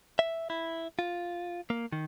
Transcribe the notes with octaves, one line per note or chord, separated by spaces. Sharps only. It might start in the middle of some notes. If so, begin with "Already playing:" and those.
E5
E4
F4
A#3
D#3